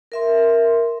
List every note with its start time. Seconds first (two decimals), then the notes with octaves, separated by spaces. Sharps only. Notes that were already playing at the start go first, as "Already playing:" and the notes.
0.12 A#4 E5 C6